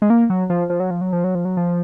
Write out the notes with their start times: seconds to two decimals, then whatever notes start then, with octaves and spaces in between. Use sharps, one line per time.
0.02 G#3
0.10 A#3
0.30 F#3
0.50 F3
0.70 F3
0.80 F#3
0.91 F3
1.01 F#3
1.12 F3
1.24 F#3
1.35 F3
1.45 F#3
1.57 F3